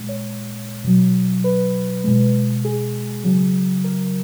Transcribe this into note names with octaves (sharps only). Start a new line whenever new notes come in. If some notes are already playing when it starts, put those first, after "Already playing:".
Already playing: A#2 G#3
C#5
B2 F#3
B4
B2 G#3
G#4
C#3 F#3
A#4